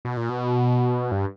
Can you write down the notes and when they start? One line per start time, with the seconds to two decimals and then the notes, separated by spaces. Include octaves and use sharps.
0.05 B2
0.17 A#2
0.29 B2
1.12 G2